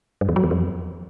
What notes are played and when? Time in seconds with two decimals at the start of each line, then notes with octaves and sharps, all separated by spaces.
0.21 G2
0.29 E2
0.36 F#3
0.44 E2
0.51 F2